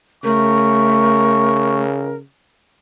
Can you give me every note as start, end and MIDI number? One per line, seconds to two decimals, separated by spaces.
0.24 2.23 49
0.24 1.83 57
0.24 2.16 70
0.24 1.81 85